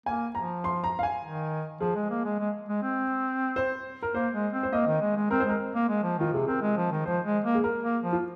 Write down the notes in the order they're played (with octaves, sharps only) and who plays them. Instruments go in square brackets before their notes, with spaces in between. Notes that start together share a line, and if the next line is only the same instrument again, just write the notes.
[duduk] A#3 [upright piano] G#5
[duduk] F3 [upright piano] A#5
[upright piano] C6
A#5
F5
G#5
[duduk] D#3
[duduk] F3 [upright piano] G#4
[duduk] G#3
A#3
G#3
G#3
G#3
C4
[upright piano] C5
A#4
[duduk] A#3 [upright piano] C5
[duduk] G#3
C4
[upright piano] C5
[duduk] A#3 [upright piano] D#5
[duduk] D#3
G#3
G#3
[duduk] C4 [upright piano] A#4
[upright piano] C5
[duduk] G#3 [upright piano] A#4
[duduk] A#3
G#3
F3
[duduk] D#3 [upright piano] F4
[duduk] C3 [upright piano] G#4
[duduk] C4 [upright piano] A#4
[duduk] G#3
F3
D#3
[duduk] F3 [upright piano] C5
[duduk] G#3
A#3
[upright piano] G#4
A#4
[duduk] A#3
F3
[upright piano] F4